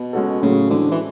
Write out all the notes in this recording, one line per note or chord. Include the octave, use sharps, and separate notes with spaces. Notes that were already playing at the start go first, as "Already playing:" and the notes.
Already playing: B2
G#3 C#4 F#4 A4
A2 C#3 F#3 A3
D3 E3 G#3 C4
E3